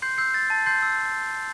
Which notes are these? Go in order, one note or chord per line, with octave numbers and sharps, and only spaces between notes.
C6 G6 C7
E6 G6 C7
G6 A6
A5 A6
C6 G6 C7
E6
G6